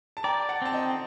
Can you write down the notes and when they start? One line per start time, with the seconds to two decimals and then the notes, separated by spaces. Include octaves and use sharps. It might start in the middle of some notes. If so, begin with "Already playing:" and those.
0.17 A5
0.24 D5 G5 A#5
0.49 F#5 A5
0.62 C4 A5
0.74 D#5 G5